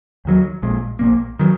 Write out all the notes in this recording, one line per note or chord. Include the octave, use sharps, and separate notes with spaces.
D#2 D#3 F#3
A#1 A#2 G#3
A#1 A#2 A#3
D#3 F#3